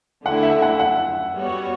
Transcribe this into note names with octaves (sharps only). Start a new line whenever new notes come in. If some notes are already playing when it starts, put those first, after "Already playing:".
D3 A3 E4 F#5
E5
F#5
F#5
G3 B3 F#4 C#5